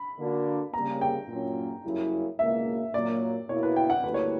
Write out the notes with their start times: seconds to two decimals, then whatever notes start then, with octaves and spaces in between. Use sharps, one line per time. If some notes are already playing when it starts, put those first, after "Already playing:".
Already playing: B5
0.18 D3 A#3 D4 F#4
0.73 C#3 G3 A#3 A#5
1.01 G5
1.28 A#2 F#3 C#4
1.84 F#2 C#3 G3 A#3 E4
2.39 C#2 B2 A#3 E4 E5
2.94 A#2 F#3 A#3 D5
3.49 B2 A#3 E4 C#5
3.63 B4
3.76 G5
3.90 F#5
4.04 D2 D3 G3 A#3 E4 B4
4.14 C#5